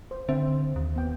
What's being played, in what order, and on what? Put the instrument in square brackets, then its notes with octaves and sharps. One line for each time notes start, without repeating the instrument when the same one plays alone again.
[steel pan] C5
[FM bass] D3 [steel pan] C4 C5 E5
[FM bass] D#2
[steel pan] B3 G5